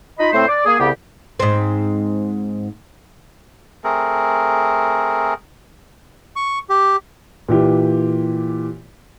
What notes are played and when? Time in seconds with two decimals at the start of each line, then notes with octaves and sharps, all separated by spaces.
0.19 D#4 F4 D#5 B5
0.33 A2 A3 C4 C5
0.48 D5
0.66 A#3 G#4
0.79 C2 C#3 B3 G4
1.40 G#2 C4
3.84 A3 C4 G#4 A#4
6.36 C#6
6.70 G4
7.49 A#2 E3 G4